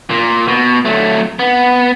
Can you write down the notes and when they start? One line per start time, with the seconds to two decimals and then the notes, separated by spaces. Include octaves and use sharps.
0.10 A#2
0.48 B2
0.85 F#3 A3
1.39 B3